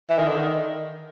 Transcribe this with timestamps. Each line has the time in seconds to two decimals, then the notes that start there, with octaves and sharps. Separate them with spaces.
0.10 E3
0.19 D#3
0.28 D3
0.36 D#3